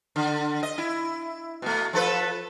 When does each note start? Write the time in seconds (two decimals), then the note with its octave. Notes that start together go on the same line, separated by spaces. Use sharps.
0.16 D3
0.63 D#5
0.78 E4
1.62 B2 A3
1.93 F3 A4 B4